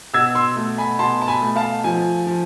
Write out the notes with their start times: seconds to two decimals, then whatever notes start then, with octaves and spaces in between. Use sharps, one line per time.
0.14 B2 E6 G#6
0.35 C6 E6
0.56 A3
0.78 G#5 B5
0.99 B2 A5 C6
1.22 A5
1.28 G#5 B5
1.42 A3
1.56 F5 A5
1.84 F3 G#5
2.27 F3